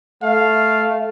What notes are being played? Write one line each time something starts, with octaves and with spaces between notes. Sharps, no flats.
A3 F5